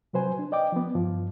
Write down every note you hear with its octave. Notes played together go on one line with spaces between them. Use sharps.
C3 F#3 B4 C5 G#5
D4
D5 D#5 G5 D6
F3 B3
G2 F3